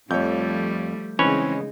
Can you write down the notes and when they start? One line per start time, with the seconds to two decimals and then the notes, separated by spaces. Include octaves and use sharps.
0.11 F2 F3 G3 A3 C#5 G6
1.19 C#3 E3 G#3 C4 C#4 D#4 B4 C#5